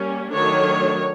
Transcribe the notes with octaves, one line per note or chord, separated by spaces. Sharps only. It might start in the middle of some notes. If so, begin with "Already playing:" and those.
Already playing: G3 A#3 C#4
D#3 F#3 A3 D4 C#5